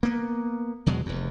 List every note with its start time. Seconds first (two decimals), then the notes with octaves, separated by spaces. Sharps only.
0.03 A#3 B3
0.86 E2 B2 F#3 G#3
1.06 F1 E2